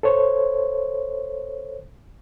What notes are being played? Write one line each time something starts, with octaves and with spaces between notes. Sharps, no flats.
A4 C5 C#5